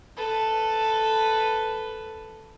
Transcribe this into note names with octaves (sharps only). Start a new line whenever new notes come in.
A4 B4